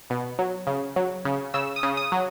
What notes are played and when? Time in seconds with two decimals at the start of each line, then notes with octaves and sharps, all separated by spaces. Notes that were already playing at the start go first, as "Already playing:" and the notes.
0.10 B2
0.39 F#3
0.67 C#3
0.96 F#3
1.25 C#3
1.54 C#3 E6
1.76 D#6
1.83 C#3
1.97 D#6
2.12 F#3